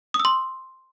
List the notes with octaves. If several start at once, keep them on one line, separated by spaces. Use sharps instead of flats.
D#6
E6
C6